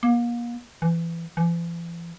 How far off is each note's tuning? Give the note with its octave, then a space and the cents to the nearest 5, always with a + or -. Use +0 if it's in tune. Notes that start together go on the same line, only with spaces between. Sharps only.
A#3 +35
E3 +25
E3 +45